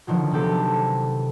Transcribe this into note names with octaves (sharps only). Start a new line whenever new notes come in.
B2 D3 D#3 F3 F#3
C3 B3 C4 G4 A4